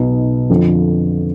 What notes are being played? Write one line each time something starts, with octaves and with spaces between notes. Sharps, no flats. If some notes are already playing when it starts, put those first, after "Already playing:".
Already playing: B1 B2 B3 D#4
F2 D3 F3